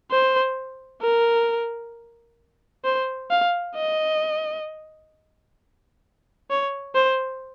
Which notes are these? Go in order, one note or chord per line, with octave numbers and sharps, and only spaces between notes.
C5
A#4
C5
F5
D#5
C#5
C5